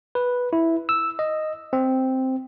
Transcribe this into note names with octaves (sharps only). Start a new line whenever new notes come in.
B4
E4
E6
D#5
C4